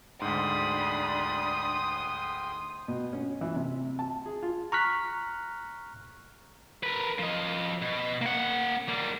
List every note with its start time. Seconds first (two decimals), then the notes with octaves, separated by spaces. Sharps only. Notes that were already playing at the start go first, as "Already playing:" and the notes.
0.22 D2 G#2 D4 G5 B5 C6 D#6
2.88 B2
3.13 C#4
3.41 E3
3.56 C3
3.99 A5
4.26 G#4
4.43 F4
4.72 A#5 C#6 F6 F#6 B6
6.84 A#4 B4
7.19 F3 D#5
7.82 B2
8.22 A#3 F#5
8.88 G3 A#3